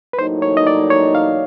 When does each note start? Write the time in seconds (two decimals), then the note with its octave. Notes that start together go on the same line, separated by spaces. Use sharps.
0.13 B4
0.18 A2 F#3 A#3 D#4 C5
0.42 C#5
0.57 D#5
0.67 D5
0.90 C#5
1.15 F5